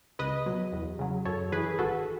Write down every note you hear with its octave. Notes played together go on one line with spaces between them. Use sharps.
C#2 B4 D#5
B2 F#3
E2
C#3 F#3
F#2 A4 C#5
E3 G#4 B4
G#1 F#4 A4